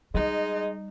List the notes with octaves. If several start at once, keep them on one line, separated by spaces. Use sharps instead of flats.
G3 G#3 D#4